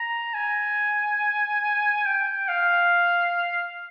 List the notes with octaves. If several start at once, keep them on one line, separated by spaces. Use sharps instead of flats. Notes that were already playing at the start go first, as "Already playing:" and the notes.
Already playing: A#5
G#5
G5
F5